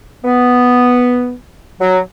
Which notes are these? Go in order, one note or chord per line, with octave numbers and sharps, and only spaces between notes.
B3
F#3